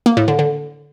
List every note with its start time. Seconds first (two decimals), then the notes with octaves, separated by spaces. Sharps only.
0.06 A#3
0.17 A2
0.28 D3
0.39 D3